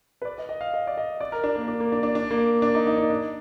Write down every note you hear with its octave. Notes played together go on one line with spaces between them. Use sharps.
B4
D5
D#5
D#5
F5
D#5
D5
D#5
D5
A#4
D4
A#3
D4
A#3
D4
D4
D4
A#3
D4
D#4
D#4
D4
D4